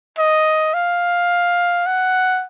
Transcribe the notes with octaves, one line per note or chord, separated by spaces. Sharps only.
D#5
F5
F#5